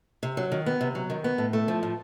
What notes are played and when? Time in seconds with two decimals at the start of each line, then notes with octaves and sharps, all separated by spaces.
0.23 C3
0.37 F#3
0.52 D#3
0.66 B3
0.81 C3
0.95 F#3
1.10 D#3
1.24 B3
1.38 A2
1.53 A3
1.68 F3
1.83 A2